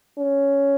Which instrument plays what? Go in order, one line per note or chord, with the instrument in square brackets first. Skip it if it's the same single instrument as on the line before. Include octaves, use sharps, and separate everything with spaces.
[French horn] C#4